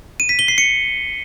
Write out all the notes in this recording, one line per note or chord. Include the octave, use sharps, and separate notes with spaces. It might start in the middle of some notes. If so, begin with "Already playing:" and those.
D#7
B6
G7
C7
C#7